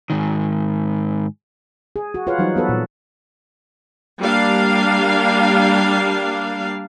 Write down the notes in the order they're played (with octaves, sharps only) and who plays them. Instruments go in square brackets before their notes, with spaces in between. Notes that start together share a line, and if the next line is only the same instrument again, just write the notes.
[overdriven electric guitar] G#2 D#3
[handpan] G#4
F#4
F4 G#4 B4 C#5 F5 F#5
E3 F#3 G3 D#4 C5
B3 F#4 A4 B4
A#2
[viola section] G3 A#3 D4 F5